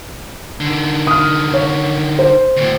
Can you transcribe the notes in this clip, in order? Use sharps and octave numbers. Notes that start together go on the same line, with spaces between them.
D3 D#3
D#6 F6
C#5
C5
D2 A2